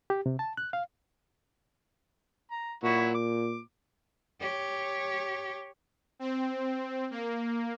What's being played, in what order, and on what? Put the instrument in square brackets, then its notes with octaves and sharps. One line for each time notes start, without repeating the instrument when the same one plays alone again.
[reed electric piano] G4
C3
A5
F#6
F5
[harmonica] A#5
[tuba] A#2 [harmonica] F#3 E4 F#4
[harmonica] D6
[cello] G4 C#5
[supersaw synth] C4
A#3